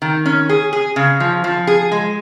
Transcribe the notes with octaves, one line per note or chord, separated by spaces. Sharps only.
D#3
C#4
G#4
G#4
C#3
F3
F3
G#4
G#3